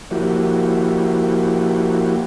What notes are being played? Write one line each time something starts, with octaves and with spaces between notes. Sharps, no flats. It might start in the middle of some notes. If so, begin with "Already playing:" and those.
F3 A#3 E4 F#4 G4